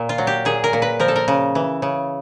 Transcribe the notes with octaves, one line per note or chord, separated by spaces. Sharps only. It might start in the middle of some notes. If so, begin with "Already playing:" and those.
Already playing: A#2
F4
F#3
G4
A#2 G#4
A#4
A#2
B4
F3 A#4
A4
A#4
C#3
E3
C#3